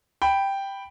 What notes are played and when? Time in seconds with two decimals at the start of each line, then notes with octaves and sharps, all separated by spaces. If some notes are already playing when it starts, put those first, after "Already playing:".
0.22 G5 B5